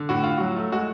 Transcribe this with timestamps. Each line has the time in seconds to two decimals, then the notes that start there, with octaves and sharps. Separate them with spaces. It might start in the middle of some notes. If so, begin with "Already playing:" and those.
Already playing: D3
0.09 A2 F#4
0.23 A2 F4
0.38 F#3 F#4
0.56 A3
0.72 G#3 F#4